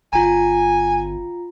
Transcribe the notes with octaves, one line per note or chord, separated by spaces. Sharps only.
G1 F4 G5 G#5 A#5